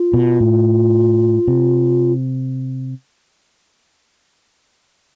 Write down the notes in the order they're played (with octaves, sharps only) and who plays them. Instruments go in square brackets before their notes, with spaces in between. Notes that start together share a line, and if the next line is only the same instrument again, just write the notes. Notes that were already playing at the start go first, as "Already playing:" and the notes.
Already playing: [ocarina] F4
[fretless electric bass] B2
A2
C3